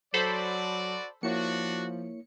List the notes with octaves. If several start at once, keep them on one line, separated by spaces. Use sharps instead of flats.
F#3 F#4 A4 C5 D5 B5
F3 A#3 D4 E4 F#4 C#5 C#7